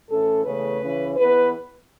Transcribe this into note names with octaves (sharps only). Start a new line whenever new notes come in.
A2 E3 C#4 A4
E2 C#3 A3 C#4 B4
C#3 E3 C#4
E2 E3 B3 B4